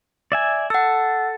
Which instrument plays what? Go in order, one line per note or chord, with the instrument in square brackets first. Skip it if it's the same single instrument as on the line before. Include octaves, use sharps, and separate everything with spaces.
[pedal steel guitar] D5 E5 G#5
[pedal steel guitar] A4 [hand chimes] F#5 E6